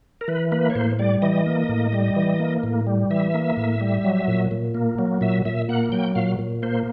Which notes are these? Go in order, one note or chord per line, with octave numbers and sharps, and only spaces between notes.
A#4
E3 B4
A#3 B4
C#5
A2 C5
G3 D5
E3 D#5
A#3
A2
G3
E3
A#3
A2
G3
E3 E5
A#3
A2
G3
F#3
A#2
A#2
A#3
F#3
A#2 E5
A#2 E5
A#3 F#5
F#3 G5
A#2 F5
A#2
A#3 C5